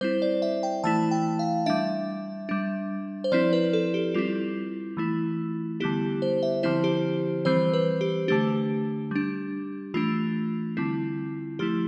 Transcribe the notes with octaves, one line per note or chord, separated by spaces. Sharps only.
G3 C4 E4 C5
D5
E5
G5
E3 A3 E4 A5
G5
F5
G3 D4 E5
G3 D4
C5
F3 C4 E4 D5
B4
A4
G4
G3 C4 E4 F4
E3 A3 E4
D3 G3 B3 E4 G4
C5
E5
D3 F3 C4 E4 C5
G4
E3 G3 C4 C5
B4
G4
D3 A3 D4 G4
G3 D4
E3 A3 D4 F4
D3 G3 C4 E4
F3 A3 E4 G4